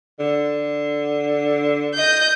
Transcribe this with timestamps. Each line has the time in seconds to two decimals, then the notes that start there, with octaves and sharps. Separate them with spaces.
0.20 D3
1.95 D#5 G6